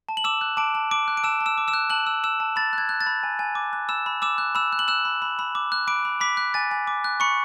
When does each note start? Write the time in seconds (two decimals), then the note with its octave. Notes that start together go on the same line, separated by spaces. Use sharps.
0.09 A5
0.17 F#7
0.24 D6 E6 E7
0.41 F#6
0.57 A5 D6 D7
0.75 A5
0.91 D6 D7
1.08 F#6
1.17 D7
1.24 A5 E6 E7
1.41 A5
1.46 E6 E7
1.58 D6
1.68 E6 E7
1.74 F#6
1.90 A5 F#6 F#7
2.07 E6
2.24 E6 E7
2.40 A5
2.56 B5 A6
2.73 F#6 G#6
2.89 F#6
3.01 A6
3.07 B5
3.23 G#5
3.39 G#5
3.55 D6
3.73 F#6
3.89 B5 E6 E7
4.06 B5
4.22 D6 E6 E7
4.38 F#6
4.55 B5 E6 E7
4.73 F#6
4.79 F#7
4.88 E6 F#6 E7
5.05 B5
5.22 B5
5.39 B5
5.55 D6
5.72 F#6
5.87 B5 D6 D7
6.05 B5
6.21 B5 D6 B6
6.37 F#6
6.54 G#5 A6
6.71 G#5
6.87 D6
7.04 F#6
7.20 B5 C#6 C#7